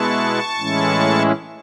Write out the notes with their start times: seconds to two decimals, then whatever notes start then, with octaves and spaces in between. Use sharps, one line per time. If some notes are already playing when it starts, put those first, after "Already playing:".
Already playing: B2 G#3 B3 E4 A5 C#6
0.58 A2 E3 G#3 C#4 E4